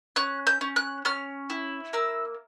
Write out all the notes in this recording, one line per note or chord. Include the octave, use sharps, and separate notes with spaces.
C#4 F#6
G6
C#4
F#6
C#4 F6
E4
A#3 E6